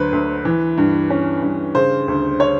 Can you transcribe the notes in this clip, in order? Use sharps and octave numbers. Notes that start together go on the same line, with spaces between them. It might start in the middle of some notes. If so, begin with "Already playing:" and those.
Already playing: D2 D3 F#3 B4 C5
D2
E3
G2
C#4
G2
C#3 C5
D2
C#5